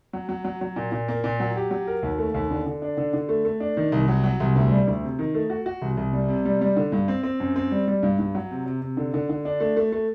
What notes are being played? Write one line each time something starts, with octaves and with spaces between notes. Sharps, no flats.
F#3
F#3
F#3
F#3
A#2
A#2
A#3
A#2
F#3
G4
F#3
A#4
D#2
A3
D#2
D3
D3
D4
D3
D3
A3
A3
D4
D#3
C2
F#3
F#3
C2
D2
G3
D2
C3
D#3
A3
F#4
F#4
C2
C2
G3
C3
G3
G3
D3
G2
C4
C4
F#2
C4
G3
G3
G2
G2
F#3
C3
C3
C3
D3
D3
D3
D4
A3
A3
A3